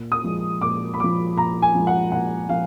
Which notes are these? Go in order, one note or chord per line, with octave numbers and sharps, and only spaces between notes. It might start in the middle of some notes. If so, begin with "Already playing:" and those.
Already playing: A#2
D#6
F3 G#3
A#2 D6
B5
F3 G#3 D6
A#2 A#5
G#5
F3 G#3
F#5
A#2 F#5
F3 F5